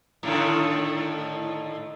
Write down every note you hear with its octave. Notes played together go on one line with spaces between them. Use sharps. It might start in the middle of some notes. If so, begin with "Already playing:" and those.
A2 D3 D#3